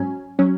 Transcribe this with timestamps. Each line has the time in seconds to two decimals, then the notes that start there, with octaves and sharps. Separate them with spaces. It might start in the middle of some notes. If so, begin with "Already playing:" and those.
Already playing: G#2 F#3 C#4 G#5
0.39 F#3 C#4